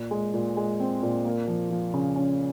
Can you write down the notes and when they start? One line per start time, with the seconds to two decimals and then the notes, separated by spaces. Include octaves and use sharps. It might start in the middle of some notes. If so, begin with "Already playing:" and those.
Already playing: A#2
0.11 G#3
0.34 A#2
0.57 G#3
0.80 C4
1.03 A#2
1.25 A#3
1.48 F3
1.71 F3
1.94 C#3
2.16 C#4